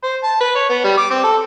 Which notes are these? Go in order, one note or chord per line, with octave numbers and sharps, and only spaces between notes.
C5
A5
B4
C#5
B3
G3
D6
C4
A4